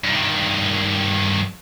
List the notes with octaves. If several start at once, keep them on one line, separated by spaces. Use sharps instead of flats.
G2 D#3